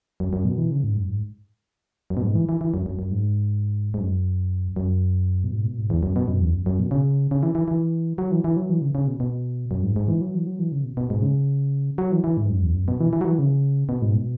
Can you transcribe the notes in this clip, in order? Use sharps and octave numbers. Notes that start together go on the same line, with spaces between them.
F#2
F#2
B2
E3
C#3
G#2
F#2
G#2
F#2
B2
G#2
E3
E3
E3
F#2
F#2
F#2
G#2
G#2
F#2
F#2
B2
G#2
B2
G#2
E2
F#2
B2
F#2
E2
F#2
F#2
B2
C#3
C#3
E3
E3
E3
F#3
E3
E3
F#3
E3
C#3
C#3
B2
B2
F#2
G#2
G#2
E3
F#3
E3
F#3
E3
C#3
B2
B2
G#2
C#3
F#3
E3
E3
G#2
F#2
E2
F#2
B2
E3
E3
F#3
E3
C#3
B2
G#2
B2